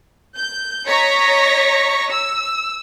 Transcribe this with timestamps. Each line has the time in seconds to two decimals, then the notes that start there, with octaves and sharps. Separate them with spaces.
0.35 G6
0.86 C#5 D#5 A#5 C#6 A#6 B6
2.11 E6